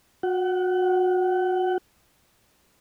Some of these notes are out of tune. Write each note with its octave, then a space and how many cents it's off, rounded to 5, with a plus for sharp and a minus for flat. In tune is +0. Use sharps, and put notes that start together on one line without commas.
F#4 -30 F#5 +35